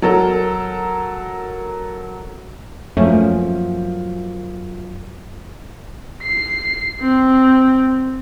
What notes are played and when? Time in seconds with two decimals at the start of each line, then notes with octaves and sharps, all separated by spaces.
0.02 F#3 A4 A#4
2.97 F#2 F3 A3 A#3 C#4
6.23 C7
7.01 C4